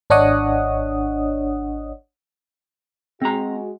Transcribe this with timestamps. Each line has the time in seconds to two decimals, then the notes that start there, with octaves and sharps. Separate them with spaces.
0.10 G#1 D4 C#5 D#5 F#5 D#6
3.22 G#3 C4 F#4 A#5